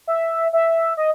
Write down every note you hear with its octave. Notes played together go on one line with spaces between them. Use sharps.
E5
E5
D#5